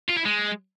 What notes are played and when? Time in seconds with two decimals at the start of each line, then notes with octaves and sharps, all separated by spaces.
0.09 F4
0.17 E4
0.25 G#3